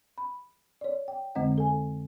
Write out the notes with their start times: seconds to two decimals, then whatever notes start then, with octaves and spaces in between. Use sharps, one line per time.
0.18 B5
0.81 C#5 D5
1.08 G5
1.35 F2 D3 G#3 C4 D#5 F#5
1.58 A4 G#5